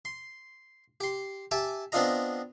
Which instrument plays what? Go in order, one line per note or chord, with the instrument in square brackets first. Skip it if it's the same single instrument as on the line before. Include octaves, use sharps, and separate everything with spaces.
[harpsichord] C6
G4 C6
G4 E5 G#5 A5 D6
B3 C4 D4 F4 D#5 A#5